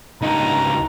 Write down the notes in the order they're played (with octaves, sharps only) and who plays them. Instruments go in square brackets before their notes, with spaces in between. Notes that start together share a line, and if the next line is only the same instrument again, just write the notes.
[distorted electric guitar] C#2 D#4 [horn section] G2 A#2 A#5